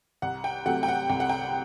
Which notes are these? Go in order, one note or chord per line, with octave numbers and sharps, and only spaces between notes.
C2 F#5
G5
C3 F#3 A3 F#5
G5
F#5
C2 G5
F#5
G5